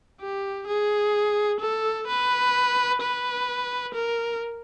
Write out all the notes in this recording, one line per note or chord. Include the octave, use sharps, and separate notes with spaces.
G4
G#4
A4
B4
B4
A#4